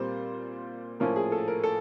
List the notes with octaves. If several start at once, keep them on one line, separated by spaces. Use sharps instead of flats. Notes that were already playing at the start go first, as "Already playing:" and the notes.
Already playing: A#2 G3 C4 C5
A2 F3 A#3 C#4 A#4
G#4
A4
A#4
A4